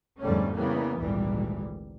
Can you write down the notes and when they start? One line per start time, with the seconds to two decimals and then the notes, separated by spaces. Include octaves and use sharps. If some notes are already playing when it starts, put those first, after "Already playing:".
0.21 F2 G#2 D3 G3 A3 C#4
0.56 C#3 E3 G3 A#3 B3
0.99 G#1 D2 A#2 E3 G3